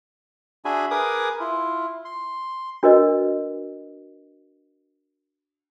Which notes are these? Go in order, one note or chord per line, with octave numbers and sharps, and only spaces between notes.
D4 F#4 G#4 E5 G#5 B5
G#4 A#4 B4 G#5 D6 D#6
E4 F4
C6
D4 F#4 A#4 B4 D#5